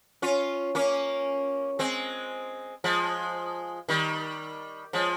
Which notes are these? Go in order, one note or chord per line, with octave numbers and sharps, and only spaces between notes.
C#4 F4
A#3 C#4
G#3 C4
F3 G#3
D#3 G3
F3 G#3